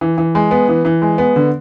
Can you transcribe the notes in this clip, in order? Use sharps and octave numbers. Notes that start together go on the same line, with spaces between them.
E3
E3
G#3
B3
E3
E3
G#3
B3
D3